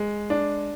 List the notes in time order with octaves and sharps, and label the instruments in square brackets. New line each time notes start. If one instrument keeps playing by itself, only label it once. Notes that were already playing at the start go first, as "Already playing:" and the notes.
Already playing: [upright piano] G#3
D4